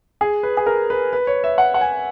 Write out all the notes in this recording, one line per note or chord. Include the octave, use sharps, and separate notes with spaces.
G#4
B4
G#4
A#4
B4
B4
C#5
E5
F#5
F#5
G#5